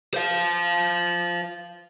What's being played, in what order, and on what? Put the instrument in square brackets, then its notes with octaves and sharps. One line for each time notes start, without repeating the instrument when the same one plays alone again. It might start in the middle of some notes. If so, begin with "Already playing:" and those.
[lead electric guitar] C5 F5